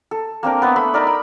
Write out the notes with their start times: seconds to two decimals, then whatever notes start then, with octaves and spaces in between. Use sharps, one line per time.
0.11 A4
0.43 A#3 C4 D4 A#4
0.62 B3 B4 E5
0.76 A3 B5 E6
0.94 D#4 A#4 D5
1.07 B5